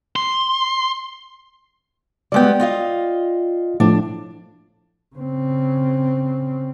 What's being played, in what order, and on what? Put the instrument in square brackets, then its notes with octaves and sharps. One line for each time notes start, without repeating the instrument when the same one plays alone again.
[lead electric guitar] C6
[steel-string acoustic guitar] G3 G#3 B3 [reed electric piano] D5 G5
[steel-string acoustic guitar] F4 D#5 F5
[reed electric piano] A2 F3 [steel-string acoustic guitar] D4
[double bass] C#3 C4